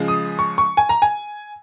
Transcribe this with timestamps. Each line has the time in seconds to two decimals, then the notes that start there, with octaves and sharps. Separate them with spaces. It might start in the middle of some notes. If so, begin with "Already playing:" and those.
Already playing: C#3 F3 G#3
0.08 D#6
0.39 C#6
0.58 C#6
0.77 G#5
0.89 A#5
1.02 G#5